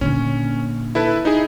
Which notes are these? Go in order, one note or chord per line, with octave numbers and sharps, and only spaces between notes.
A#2 D3 C#4
E4 A4 B4
D#4 E4 G#4